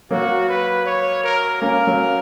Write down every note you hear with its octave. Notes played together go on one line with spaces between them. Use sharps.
F#3 A#3 F#4
B4
C#5
A#4
A#3 C#4 A#4
F#3 A#3